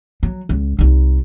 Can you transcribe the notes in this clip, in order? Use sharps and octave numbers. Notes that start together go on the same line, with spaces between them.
F#3
C#2
C2 D#4